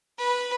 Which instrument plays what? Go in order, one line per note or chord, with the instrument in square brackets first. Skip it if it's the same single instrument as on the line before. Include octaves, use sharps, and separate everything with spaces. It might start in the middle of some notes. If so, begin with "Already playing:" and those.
[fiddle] B4